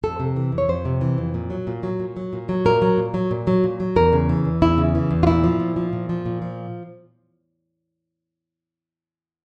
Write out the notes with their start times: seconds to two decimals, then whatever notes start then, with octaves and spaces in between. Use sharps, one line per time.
0.03 F2 A4
0.20 C3
0.36 E3
0.52 F2
0.58 C#5
0.69 F2 C5
0.85 C3
1.01 E3
1.18 F2
1.34 A#2
1.50 F#3
1.67 A#2
1.83 F#3
2.00 A#2
2.17 F#3
2.33 A#2
2.49 F#3
2.65 A#2 A#4
2.82 F#3
2.98 A#2
3.14 F#3
3.31 A#2
3.47 F#3
3.64 A#2
3.80 F#3
3.96 E2 A#4
4.13 C#3
4.29 E3
4.45 E2
4.62 E2 E4
4.78 C#3
4.95 E3
5.11 E2
5.23 F4
5.27 A#2 E4
5.44 F3
5.60 A#2
5.76 F3
5.93 A#2
6.09 F3
6.26 A#2
6.42 F3